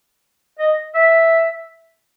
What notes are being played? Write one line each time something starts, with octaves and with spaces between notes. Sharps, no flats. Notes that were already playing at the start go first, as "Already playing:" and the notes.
D#5
E5